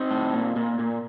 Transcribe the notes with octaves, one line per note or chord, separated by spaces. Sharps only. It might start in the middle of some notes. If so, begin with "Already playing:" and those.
Already playing: C4 D#4
A2
A#2
A#2
A#2